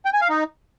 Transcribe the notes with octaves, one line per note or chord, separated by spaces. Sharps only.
G5
G#5
F5
D#4